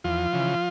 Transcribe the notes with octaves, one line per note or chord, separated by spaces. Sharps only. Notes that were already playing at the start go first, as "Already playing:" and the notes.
E2 F3 F4
C#3 E3